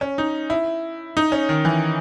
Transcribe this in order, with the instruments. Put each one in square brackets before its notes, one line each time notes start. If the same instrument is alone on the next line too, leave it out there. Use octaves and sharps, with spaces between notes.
[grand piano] C#4
D#4
E4
D#4
C#4
D#3
E3